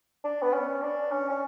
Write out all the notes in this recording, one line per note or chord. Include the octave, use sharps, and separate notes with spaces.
D4
B3
C#4
D4
C#4
C#4